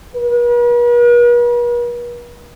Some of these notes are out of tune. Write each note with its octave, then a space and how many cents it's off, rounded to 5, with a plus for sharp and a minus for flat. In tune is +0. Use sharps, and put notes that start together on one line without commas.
B4 -45